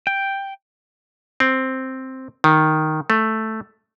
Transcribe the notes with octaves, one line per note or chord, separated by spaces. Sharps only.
G5
C4
D#3
A3